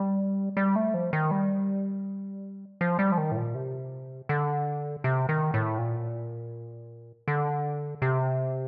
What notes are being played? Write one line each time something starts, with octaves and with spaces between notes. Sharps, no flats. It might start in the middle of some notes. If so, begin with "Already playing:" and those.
Already playing: G3
G3
A3
F3
D#3
G3
F3
G3
F3
D#3
A2
A#2
C3
D3
C3
D#3
A2
A#2
D3
C3